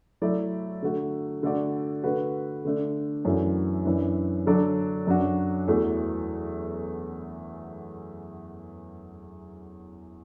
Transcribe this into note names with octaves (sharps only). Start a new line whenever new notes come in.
F#3 A3 E4 D5
D3 A3 F#4
D3 A3 F#4 D5
D3 A3 F#4 B4
D3 A3 D4
F#2 E3 A3 D4 F#4
F#2 E3 D4
D3 F#3 D4 A4 D5
F#2 F#3 D4 F#4
E2 E3 A3 F#4